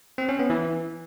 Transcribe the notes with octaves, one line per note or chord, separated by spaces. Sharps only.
C4
C#4
B3
E3